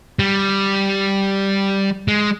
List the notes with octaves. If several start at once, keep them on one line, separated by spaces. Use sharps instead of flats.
G3
G#3